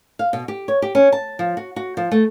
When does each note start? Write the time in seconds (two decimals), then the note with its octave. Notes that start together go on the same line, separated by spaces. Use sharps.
0.19 F5
0.33 B2
0.48 G4
0.68 C#5
0.82 G4
0.95 C#4
1.12 A5
1.39 F3
1.57 F#4
1.76 F#4
1.97 F3
2.11 A3